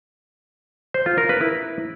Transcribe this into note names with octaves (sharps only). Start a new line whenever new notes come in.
C5
F4
A#4
B4
E4